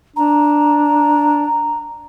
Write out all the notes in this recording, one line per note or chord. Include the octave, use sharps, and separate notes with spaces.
D4 A#5